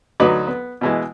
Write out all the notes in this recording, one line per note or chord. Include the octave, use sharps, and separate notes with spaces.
D2 F#3 D#4 B4 D6
B3
B2 E3 G#3